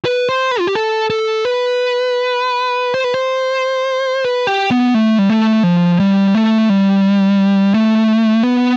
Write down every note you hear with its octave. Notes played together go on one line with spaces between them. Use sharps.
B4
C5
B4
F4
G4
A4
A4
B4
C5
B4
C5
B4
G4
B3
A3
G3
A3
F3
G3
A3
G3
A3
B3